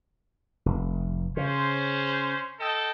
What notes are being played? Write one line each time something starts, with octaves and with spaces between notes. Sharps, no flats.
F1
C#3 C#4 C5
A4 D#5 G5